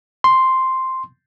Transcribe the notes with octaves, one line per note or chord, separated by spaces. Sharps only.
C6